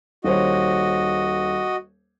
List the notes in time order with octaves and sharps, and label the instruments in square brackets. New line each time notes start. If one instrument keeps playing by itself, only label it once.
[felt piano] D#1 C5 C#5 [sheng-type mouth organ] F#4 D#5